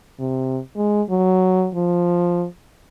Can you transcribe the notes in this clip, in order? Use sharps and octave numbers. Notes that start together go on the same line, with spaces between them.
C3
G#3
F#3
F3